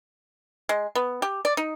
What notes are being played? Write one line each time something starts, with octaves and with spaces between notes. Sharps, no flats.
G#3
B3
G4
D5
D#4